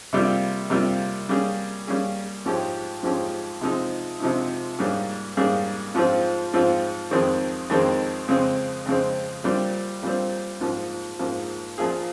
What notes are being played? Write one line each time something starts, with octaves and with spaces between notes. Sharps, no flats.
C3 G3 A#3 F4
C3 G3 A#3 F4
G3 A#3 C#4 G#4
G3 A#3 C#4 G#4
G#2 F3 G#3 C#4 G4
G#2 F3 G#3 C#4 G4
C3 F3 G#3 D#4
C3 F3 G#3 D#4
G#2 G3 A#3 C#4 G#4
G#2 G3 A#3 C#4 G#4
G#2 F3 C4 F4
G#2 F3 C4 F4
F2 D#3 G#3 C4
F2 D#3 G#3 C4
F2 C#3 G#3 C4
F2 C#3 G#3 C4
A#2 G3 C4
A#2 G3 C4
G#2 F3 A#3
G#2 F3 A#3
A#2 F3 A#3 F4 G#4